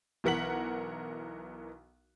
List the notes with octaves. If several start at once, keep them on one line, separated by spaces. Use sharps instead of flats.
B1 E3 A#4 F#5 B6 F#7